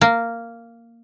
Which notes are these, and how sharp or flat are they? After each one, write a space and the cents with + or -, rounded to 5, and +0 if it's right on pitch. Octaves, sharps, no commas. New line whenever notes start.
A#3 -10